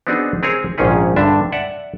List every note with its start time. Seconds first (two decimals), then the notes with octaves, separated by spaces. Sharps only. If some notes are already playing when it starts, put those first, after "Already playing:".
0.07 B3 C4 D4 D#4 F#4 G#4
0.43 C4 G#4 A#4 C#5
0.78 A#1 G#2 D#3 C#4 G#4
1.16 G2 D3 D4 E5
1.52 D5 E5 F#5